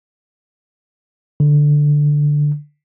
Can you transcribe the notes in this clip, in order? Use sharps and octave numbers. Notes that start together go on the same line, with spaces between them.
D3